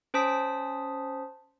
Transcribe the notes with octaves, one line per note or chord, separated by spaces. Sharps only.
C#4 C5 A5 D#6 B6